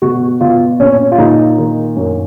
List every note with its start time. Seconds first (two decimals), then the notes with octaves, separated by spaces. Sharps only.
0.02 B2 F#4
0.41 B2 F4
0.79 A#2 C#4
1.12 F4
1.18 A#2 D#4
1.58 D#3
1.96 F#2